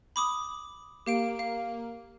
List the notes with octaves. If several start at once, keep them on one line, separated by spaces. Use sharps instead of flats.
B5 D6 D#6
A#3 G4 F5 D7
F5